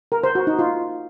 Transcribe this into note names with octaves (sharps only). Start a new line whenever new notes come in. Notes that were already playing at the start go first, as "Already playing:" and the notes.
A#4
C5
F#4
D#4
F4